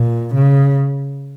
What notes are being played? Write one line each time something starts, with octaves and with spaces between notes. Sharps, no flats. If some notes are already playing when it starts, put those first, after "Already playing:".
Already playing: A#2
C#3